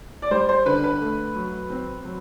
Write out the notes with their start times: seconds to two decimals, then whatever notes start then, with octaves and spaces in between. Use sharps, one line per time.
0.22 D5
0.31 G3 C5
0.49 C5
0.66 D3 B4
0.84 B4
1.01 A3
1.35 F#3
1.70 C4
2.05 F#3